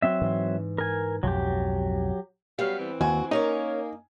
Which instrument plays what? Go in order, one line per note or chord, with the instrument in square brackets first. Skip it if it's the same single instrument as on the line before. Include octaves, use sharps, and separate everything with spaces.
[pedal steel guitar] F#3 C4 E5
[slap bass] G#2 E3
[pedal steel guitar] A#4 G#5
[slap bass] B1 F2 G#2 [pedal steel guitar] F#3 G4
[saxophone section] F#3 C#4 F5 [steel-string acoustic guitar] G3 B3
[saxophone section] E3 C4
[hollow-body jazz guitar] D#2 [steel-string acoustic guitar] F#4 [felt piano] G#5
[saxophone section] A#3 [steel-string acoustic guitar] C#4 A#4 C#5 [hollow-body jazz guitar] D#4